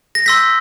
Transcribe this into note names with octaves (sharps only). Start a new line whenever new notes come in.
A#6
C6 E6 G6 B6